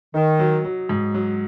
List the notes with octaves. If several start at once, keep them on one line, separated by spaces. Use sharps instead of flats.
D#3 D#4
F#3
F#3
G#2
F#3